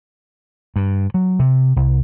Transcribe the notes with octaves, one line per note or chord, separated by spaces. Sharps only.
G2
F#3
C3
C2